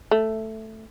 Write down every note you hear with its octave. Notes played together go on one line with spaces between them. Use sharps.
A3